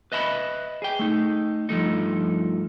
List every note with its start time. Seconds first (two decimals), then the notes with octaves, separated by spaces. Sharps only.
0.12 B4 D#5 E5 A#5 B5
0.82 G#4 G5
0.99 A3 D#4
1.69 G2 F3 A3 D#4